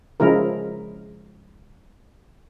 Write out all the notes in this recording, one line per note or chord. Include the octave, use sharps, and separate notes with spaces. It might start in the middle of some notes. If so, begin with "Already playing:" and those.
C#3 F3 G#3 E4 A#4